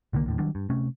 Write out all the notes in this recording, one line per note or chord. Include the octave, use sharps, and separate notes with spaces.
C2 D3 D#3 A#3
D#2 A2 D3
D#3 F#3 G3 D4
G2
C3 A3 C#4